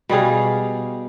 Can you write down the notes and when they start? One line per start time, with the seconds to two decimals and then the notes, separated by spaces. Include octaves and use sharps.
0.09 B2 G3 G#4 F5